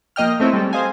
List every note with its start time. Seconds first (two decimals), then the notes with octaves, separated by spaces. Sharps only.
0.16 F3 A#3 D#5 G5 F6
0.40 A3 C4 E4 C#5
0.53 G3 G#3 C4 A4
0.73 C5 D#5 F5 G#5